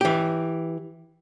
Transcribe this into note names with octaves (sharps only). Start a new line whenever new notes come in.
E3 G4